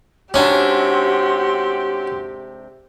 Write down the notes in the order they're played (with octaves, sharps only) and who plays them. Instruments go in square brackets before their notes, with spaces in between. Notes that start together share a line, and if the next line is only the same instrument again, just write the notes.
[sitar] G#2 C3 D4 [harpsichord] C#4 [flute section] F#4 C6 E6 [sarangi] G4